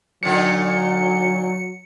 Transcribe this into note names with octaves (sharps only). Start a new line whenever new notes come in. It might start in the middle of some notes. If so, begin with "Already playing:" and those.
A#2 D3 F#3 D#4 C#7